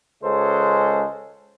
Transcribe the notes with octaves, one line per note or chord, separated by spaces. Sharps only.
C#2 G#3 C#4 A4 C5